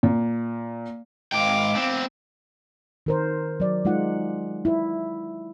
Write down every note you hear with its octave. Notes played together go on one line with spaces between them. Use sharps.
A#2
G#2 F5 G5 D6
B3 C4
D#3 A#4 C5
F#3 D5
G#3 D#4 F4 F#5
E4